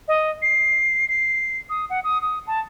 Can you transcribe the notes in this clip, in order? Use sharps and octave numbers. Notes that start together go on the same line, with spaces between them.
D#5
C7
C7
D#6
F#5
D#6
D#6
A5